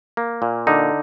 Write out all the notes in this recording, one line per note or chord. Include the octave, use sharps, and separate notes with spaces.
A#3
A#2
D3 D#4